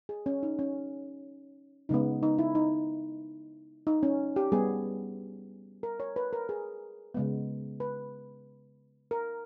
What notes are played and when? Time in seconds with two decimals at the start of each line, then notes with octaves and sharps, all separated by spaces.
0.09 G#4
0.26 C#4
0.43 D#4
0.59 C#4
1.89 C#3 G#3 B3 D#4
2.23 D#4
2.38 E4
2.55 D#4
3.87 D#4
4.03 C#4
4.36 G4
4.52 G3 B3 G#4
5.83 A#4
6.00 C#5
6.16 B4
6.33 A#4
6.49 G#4
7.14 C#3 G#3 B3
7.80 B4
9.11 A#4